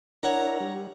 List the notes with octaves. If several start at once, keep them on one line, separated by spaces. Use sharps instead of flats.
D4 E4 A#4 C#5 F#5 A#5
G3